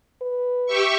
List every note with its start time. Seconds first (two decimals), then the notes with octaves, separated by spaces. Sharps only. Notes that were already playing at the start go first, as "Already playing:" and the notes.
0.22 B4
0.66 G4 E5 C#6